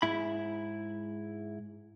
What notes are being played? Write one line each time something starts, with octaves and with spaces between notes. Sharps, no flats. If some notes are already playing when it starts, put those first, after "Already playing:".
G#2 E4 B5